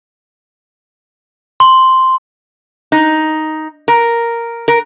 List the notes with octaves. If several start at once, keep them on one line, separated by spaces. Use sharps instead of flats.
C6
D#4
A#4
A#4